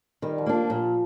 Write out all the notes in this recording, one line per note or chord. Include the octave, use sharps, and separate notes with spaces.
D#3 G3
F3
A#3 D4
F3
A#2 F3